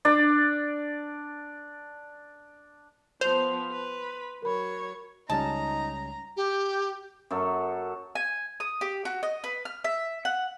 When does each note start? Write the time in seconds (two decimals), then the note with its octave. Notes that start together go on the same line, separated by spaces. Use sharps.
0.05 D4 D5
3.21 F3 B3 C5 C6 F7
3.71 B4
4.42 F#3 A#4 C#5 B5
5.30 C#2 G3 C#4 D#4 A5 A#5
6.37 G4
7.31 F#2 F#3 A4
8.15 G#5
8.60 D#6
8.81 G4
9.05 F#4
9.23 D#5
9.44 B4
9.65 F6
9.84 E5
10.25 F#5